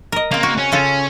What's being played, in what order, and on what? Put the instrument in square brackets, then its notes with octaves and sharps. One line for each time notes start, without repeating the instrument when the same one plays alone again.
[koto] A#4 D#5
[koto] C#3 C4 [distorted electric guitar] A#3
[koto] F#4
[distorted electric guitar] C#4
[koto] C#3 F4 A4